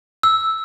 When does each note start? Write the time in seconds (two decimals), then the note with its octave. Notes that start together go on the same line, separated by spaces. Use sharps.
0.23 E6